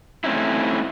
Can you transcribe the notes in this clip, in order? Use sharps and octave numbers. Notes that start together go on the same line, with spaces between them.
A3 C4 C#4 D#4 E4